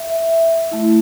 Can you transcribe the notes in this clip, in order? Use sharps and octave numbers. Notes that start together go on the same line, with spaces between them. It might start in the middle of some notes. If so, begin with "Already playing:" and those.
Already playing: E5
A3 E4